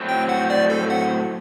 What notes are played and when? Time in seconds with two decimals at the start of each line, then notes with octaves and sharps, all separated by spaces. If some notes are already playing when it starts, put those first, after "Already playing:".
Already playing: A2 F#3 C4
0.09 G5
0.29 F#5
0.50 D5
0.70 A4
0.90 F#5